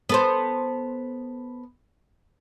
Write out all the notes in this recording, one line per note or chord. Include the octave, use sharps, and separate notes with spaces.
B3 A4 C5